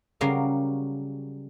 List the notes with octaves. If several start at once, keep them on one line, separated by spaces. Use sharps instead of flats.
C#3 F#3 G3 A#4 F5